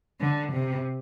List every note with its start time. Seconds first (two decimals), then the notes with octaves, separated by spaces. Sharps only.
0.20 D3
0.52 C3